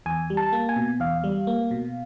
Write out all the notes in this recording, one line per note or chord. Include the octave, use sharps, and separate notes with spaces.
E2 G#5
G3
A5
A#3
G#5
B2
E2 F5
G3
A#3
B2